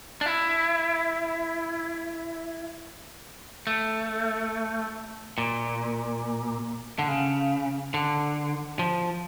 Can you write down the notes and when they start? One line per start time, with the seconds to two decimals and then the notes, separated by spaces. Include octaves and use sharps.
0.21 D4
0.26 E4
3.67 A3
5.38 A#2
6.99 D3
7.08 C#3
7.94 D3
8.79 F3